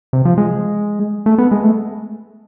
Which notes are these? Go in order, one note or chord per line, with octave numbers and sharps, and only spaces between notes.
C3
F3
G#3
A3
B3
G#3
A3